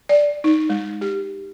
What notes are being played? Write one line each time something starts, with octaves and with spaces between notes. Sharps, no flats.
D5
D#4
G#3
G4